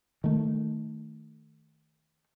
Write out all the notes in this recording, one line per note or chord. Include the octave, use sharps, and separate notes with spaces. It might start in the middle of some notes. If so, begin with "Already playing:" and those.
D#3 A3